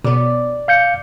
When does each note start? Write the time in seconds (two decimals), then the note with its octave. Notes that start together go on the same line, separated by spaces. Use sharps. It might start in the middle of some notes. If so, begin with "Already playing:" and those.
0.04 B2 B3 D5
0.68 F5 G6 C#7